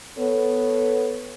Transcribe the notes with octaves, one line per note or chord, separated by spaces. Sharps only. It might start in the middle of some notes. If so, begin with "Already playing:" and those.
B3 A4 C#5